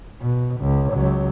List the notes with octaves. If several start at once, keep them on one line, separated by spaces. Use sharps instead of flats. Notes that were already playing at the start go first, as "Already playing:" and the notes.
B2
C#2
C#2 F#3